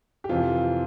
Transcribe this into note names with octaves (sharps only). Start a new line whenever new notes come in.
G4
F2 C3 E3 F4